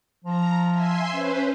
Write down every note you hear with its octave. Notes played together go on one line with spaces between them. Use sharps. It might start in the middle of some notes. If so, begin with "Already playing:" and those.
F3 A#5
E5 G#5 C6
C#4 B4 C5